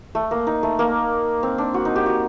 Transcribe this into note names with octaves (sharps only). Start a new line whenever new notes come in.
A3
A#3
D#4
A3
A#3
C4
D4
F#4
D#4
G4
F#4